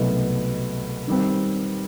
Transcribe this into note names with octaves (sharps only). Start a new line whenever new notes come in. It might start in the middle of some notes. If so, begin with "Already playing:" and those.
Already playing: C2 B2 F#3 A3 D#4
D#3 G3 C4